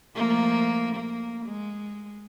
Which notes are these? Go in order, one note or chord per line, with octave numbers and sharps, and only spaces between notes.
F3 A3 A#3
A#3
G#3